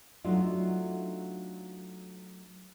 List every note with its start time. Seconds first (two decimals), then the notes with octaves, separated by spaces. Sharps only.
0.24 F#3 A3 D4 D#4 F4